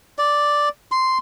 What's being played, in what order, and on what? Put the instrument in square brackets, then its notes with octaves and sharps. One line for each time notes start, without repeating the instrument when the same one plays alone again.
[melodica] D5
C6